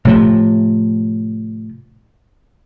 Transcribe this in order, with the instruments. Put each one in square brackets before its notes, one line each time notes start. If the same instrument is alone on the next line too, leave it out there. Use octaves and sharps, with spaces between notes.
[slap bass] A2 C3 F3